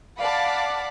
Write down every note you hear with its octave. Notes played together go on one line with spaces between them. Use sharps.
D5 F5 F#5 A5 B5 D6